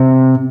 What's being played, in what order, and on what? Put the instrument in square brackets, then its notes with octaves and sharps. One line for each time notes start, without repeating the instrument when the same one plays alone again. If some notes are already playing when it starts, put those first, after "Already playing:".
Already playing: [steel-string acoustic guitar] C3